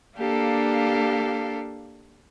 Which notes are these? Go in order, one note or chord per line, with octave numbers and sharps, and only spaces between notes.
A#3 D4 G4 A4 F5